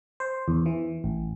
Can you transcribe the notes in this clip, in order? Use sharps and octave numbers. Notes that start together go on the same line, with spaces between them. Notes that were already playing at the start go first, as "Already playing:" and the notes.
C5
E2
E3
A1